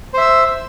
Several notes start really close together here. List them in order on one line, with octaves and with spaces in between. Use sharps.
C5 E5 E6